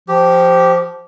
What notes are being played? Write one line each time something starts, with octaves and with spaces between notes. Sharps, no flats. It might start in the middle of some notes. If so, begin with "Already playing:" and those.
F3 G4